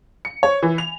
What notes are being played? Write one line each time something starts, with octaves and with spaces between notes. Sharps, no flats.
C#7
C#5
E3
F7